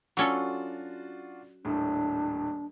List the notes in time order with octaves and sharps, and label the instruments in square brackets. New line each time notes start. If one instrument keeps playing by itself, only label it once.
[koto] F#3 C#4 A4 [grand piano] D4 F4 F#4
[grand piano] D#1 A2 [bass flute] D4